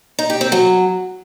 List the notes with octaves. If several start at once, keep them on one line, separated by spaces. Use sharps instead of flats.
D#4
G4
C4
F#3